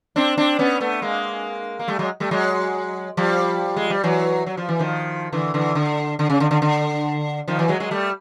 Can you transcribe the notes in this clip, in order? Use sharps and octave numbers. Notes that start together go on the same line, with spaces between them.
C4 D4
C4 D4
B3 C#4
A3 B3
G#3 A#3
A#3
G3 A3
F#3 G#3
G3 A3
F#3 G#3
F3 G3
G#3
G3
E3 F#3
F#3
F3
E3
D#3 F3
D3 E3
D3 E3
D3
D3
C#3
D3
D3
D3
D#3 F3
E3 F#3
F#3 G#3
F#3 G#3
G3 A3